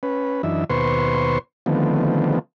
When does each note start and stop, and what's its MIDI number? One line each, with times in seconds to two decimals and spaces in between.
0.03 0.42 61
0.03 0.42 71
0.43 0.64 42
0.43 0.64 52
0.43 0.64 62
0.43 0.64 63
0.43 0.64 76
0.70 1.39 39
0.70 1.39 47
0.70 1.39 71
0.70 1.39 72
0.70 1.39 84
0.70 1.39 85
1.66 2.39 50
1.66 2.39 51
1.66 2.39 53
1.66 2.39 57
1.66 2.39 59
1.66 2.39 60